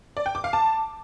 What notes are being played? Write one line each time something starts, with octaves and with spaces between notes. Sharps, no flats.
D5
G5
D6
F5
A5